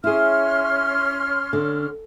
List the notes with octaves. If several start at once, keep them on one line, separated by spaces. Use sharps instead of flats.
C#4 E4 G#4 C6 F6
D3